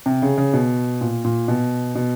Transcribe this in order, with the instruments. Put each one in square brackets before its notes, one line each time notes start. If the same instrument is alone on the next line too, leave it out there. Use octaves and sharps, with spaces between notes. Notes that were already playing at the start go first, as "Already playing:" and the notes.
[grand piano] C3
C#3
C#3
B2
A#2
A#2
B2
B2